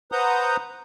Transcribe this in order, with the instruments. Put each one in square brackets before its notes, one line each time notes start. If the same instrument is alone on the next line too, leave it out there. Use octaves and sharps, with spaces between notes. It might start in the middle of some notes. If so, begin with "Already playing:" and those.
[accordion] B4 C5 F#5 A#5 D#6 G6